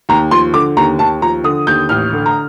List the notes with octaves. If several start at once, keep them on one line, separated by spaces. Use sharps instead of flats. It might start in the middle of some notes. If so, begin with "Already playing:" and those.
D#2 A#5
F3 C6
D3 D6
D#2 A#5
D#2 A5
F3 A#5
D3 D#6
D#2 G6
A1 F6
D3
A#5